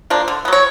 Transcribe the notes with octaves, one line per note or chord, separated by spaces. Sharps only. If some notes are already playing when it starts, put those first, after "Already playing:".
F3 A#3 D4
D3
B3
F#3 C#5